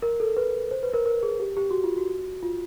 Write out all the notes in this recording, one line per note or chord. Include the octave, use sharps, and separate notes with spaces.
A#4
A4
B4
C5
B4
A#4
A#4
G#4
G4
G4
F#4
F4
F#4
F4